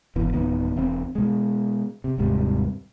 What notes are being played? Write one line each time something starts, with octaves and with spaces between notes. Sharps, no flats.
G1 B2 E3
D1 D#3 B3
E1 C4
B2 G#3
C3
D#1 G#2 C3 G3